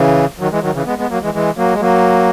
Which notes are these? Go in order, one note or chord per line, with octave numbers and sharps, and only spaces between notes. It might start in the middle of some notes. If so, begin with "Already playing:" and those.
Already playing: C#3 E3
D#3 F#3
E3 G#3
D#3 F#3
C#3 E3
G#3 B3
G#3 B3
F#3 A#3
E3 G#3
E3 G#3
F#3 A#3
G#3
F#3 A#3